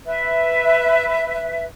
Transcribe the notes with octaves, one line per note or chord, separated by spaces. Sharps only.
B4 E5